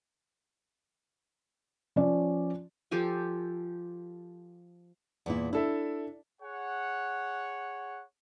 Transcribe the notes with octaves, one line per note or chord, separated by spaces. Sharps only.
F3 C#4 D5
F3 G4 A4 G#5
E2 A#2 E4
D4 E4 A4 E5
G#4 C#5 F#5